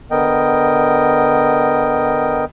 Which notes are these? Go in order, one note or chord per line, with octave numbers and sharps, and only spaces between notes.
D3 B3 A#4 D#5 G5